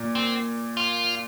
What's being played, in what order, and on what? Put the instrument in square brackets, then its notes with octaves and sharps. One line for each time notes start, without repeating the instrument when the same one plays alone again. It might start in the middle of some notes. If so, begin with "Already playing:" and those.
Already playing: [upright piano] A#2
[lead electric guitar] C4
F4